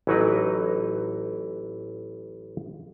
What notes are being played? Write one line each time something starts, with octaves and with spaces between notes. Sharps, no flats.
A1 E3 F#3 D#4 A#4 B4